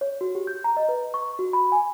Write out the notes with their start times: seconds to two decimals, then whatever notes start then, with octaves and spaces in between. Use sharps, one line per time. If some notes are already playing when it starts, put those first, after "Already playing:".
0.01 C#5
0.21 F#4
0.35 G4
0.47 G6
0.64 A#5
0.77 D#5
0.89 B4
1.14 C#6
1.39 F#4
1.53 B5
1.72 G#5